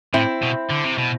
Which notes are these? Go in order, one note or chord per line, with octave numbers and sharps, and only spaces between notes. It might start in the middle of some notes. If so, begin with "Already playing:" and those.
A2 C4 E4
B2
D3
C3
B2